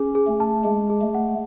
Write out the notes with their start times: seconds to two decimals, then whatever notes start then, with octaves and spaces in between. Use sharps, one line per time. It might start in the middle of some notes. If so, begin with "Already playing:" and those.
Already playing: C#4 G#4
0.15 G#4
0.27 A3
0.40 A5
0.64 G#3 G#4
0.90 G#4
1.02 A3
1.14 F#5